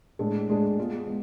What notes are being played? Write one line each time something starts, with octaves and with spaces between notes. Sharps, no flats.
A2 G#3 D4 G#4
A2 G#3 D4 G#4
G#3 B3 F4 G#4
G#3 B3